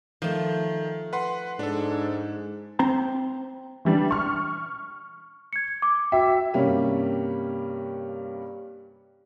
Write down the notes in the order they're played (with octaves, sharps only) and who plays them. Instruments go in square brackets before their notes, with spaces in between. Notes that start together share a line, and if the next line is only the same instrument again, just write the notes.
[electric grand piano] D#3 [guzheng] F3 A3
[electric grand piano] B4 F#5 C6
[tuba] G#2 [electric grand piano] D4 A4
[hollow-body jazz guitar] C4 C5 A#5
[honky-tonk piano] E3 G3 D4
C#6 F6
[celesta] G#6 C#7
D6
[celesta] F#4 G5 [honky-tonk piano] E5
[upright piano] G2 C3 G3 A#3 C#4